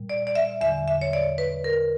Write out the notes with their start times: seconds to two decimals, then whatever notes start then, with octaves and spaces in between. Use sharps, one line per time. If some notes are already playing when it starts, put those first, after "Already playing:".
Already playing: A#2 G3
0.09 D5
0.27 D5
0.35 E5
0.61 E2 D3 F#3 E5
0.88 E5
1.02 C#5
1.13 D5
1.38 B4
1.64 A#4